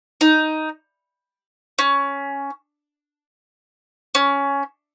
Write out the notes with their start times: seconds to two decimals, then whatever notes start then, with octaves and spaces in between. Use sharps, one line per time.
0.21 D#4
1.79 C#4
4.15 C#4